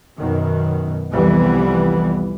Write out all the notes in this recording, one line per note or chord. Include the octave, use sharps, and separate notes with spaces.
F#2 B2 D#3
C2 F2 E3 G3 B3